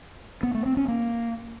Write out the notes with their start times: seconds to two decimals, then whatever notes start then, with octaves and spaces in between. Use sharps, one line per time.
0.43 B3
0.54 A3
0.66 C4
0.77 C#4
0.88 A#3